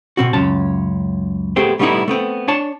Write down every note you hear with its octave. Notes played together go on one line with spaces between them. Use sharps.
B2 C4 F#4
C#2 F#2 C#4 A5
A3 B3 C4 G4 G#4 C5
G3 A3 B3 C#4 D#4 E4
A3 B3 C4
D4 C#5 G#5 A5